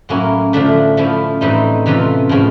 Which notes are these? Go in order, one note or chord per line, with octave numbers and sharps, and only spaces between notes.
A2 F#3 A#3 C#4 E4
D3 F3 A3 D4
F3 A3 C#4 E4
A2 E3 G3 C4 D#4
C3 E3 A3 C#4 F4
A2 F3 G#3 C#4